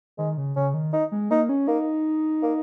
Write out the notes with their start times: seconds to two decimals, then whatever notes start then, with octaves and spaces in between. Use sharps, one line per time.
0.18 D#3 G#3
0.37 C#3
0.56 C#3 C#4
0.74 D#3
0.93 D#4
1.12 G#3
1.30 A#3 D#4
1.49 C#4
1.67 A#3 D#4
2.42 A#3